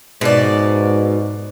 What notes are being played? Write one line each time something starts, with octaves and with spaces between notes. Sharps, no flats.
G#2 B2 D5